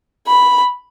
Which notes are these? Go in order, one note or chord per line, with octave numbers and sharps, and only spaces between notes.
B5